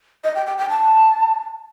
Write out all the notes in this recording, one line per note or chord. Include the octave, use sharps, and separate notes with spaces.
D#5
G5
G5
G5
A5